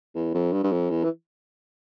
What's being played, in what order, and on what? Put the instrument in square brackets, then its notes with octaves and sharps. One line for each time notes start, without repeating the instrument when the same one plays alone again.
[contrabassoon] E2
F2
G2
G2
F2
E2
E3